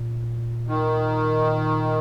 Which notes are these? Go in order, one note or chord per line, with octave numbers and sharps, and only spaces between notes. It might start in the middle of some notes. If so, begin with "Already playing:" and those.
Already playing: A#2
D#3